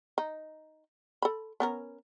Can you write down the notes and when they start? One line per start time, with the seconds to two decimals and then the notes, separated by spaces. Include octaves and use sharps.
0.18 D#4
1.22 A4 B5
1.60 B3 C#4 A#4